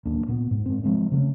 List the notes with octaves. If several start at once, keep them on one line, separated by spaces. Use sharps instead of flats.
D1 D#2 A#3 D4
A#2 B3
G#2
G#2 C4
F3 F#3 G#3 C4
C#3 A3 A#3 C#4